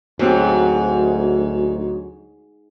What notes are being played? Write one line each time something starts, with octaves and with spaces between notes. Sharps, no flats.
D2 G#2 F#3 C4 G4